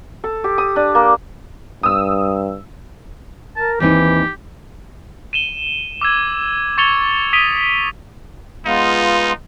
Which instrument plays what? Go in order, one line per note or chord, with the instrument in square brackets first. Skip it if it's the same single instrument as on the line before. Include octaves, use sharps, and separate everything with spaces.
[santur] A4
G4
D#6
D4
A#3
[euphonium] G2 [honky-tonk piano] D#6 E6
[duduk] A#4 [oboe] A5
[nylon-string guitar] D#2 C4 D#4 [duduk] E3 [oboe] G4
[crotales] D#7 E7 G7
D6 E6 G#6
C#6 G#6 A6 C#7 F7 G7
D#6 B6 D7 D#7 F7 G7
[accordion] G#3 B3 F4 [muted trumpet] D#4